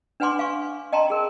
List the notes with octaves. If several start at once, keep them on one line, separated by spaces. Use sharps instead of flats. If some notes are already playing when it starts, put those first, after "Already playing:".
D4 B4 F#5 G#5 C6 D6
F5 G#5 C#6
D#5 G5 A5 A#5 C6
G#4 A#4